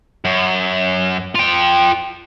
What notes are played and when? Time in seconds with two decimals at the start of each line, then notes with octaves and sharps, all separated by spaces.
0.25 F#2
1.35 F4 G5